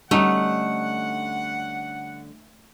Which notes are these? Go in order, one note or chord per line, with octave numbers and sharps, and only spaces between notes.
D3 G3 A3 C#4 D#4 F#5